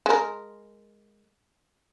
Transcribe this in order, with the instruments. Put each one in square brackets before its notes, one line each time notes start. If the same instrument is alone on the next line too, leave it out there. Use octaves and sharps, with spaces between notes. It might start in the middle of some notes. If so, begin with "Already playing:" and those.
[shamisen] G#3 A#4